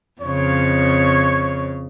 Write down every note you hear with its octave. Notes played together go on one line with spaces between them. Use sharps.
F2 C#3 C#5